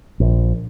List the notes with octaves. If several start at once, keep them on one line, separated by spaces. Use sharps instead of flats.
A#1